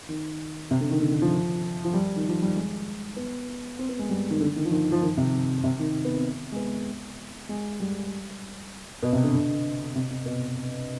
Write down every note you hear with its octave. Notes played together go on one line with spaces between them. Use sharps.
D#3
C3
D3
D#3
D3
D3
F3
F3
G3
D#3
F3
G3
G#3
B3
C4
B3
G#3
G3
D#3
D3
D#3
F3
D#3
F3
D#3
C3
C3
D#3
B3
C4
G#3
B3
G#3
G3
B2
C3
D3
D3
C3
C3
B2